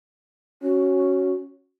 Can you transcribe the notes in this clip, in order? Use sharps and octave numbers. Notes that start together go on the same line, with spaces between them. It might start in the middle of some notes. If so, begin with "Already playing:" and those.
C#4 F#4